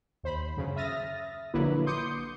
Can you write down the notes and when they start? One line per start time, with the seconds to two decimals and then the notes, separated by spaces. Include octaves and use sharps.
0.23 D#2 C5 B5
0.57 F#2 C#3
0.76 E5 D#6 F6 A6 A#6
1.54 A#1 D3 F#3 A#3 E4 B4
1.86 C6 D6 D#6 G6 C#7